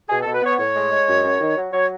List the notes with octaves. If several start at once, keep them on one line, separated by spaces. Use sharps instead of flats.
B2 G#4
B2 A4
B4
B3 C#5
A2 C#5
G#3
G#3
F#2
F#2
D#3
F#3
F#3 C#5